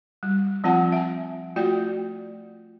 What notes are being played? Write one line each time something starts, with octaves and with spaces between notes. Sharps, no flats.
G3
F3 C4 F4 F#5 A5
E5 G#5
A3 F4 F#4 D5 G5